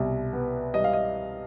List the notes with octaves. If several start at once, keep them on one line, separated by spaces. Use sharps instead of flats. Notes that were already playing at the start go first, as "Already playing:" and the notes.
Already playing: C2 B2
B3
G3 D#5
F5
D#5